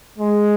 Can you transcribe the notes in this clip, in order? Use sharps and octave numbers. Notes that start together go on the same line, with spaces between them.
G#3